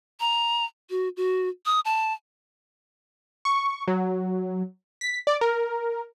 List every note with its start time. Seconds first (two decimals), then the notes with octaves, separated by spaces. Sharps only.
0.20 A#5
0.90 F#4
1.17 F#4
1.66 D#6
1.85 A5
3.45 C#6
3.88 F#3
5.01 B6
5.27 D5
5.41 A#4